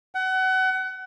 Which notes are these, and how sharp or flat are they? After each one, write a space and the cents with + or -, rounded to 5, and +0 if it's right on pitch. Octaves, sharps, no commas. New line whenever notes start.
F#5 +30